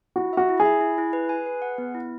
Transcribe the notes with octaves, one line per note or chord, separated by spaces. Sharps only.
E4 F#4
F#4 E5
E4
G#4
E5
E4
E4
B4
G#5
B4
F#5
B3
E4